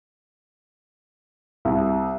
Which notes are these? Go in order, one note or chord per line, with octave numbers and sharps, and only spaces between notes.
C2